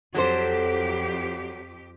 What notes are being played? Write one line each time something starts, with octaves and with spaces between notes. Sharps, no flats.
F2 F#3 G4 A4 C5